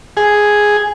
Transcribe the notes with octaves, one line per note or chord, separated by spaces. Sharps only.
G#4